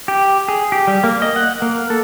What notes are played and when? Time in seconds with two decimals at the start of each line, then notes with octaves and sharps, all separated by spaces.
0.08 G4
0.48 G#4
0.72 G4
0.88 G3
1.04 A#3
1.22 D#5
1.36 F#5
1.62 A#3
1.90 A4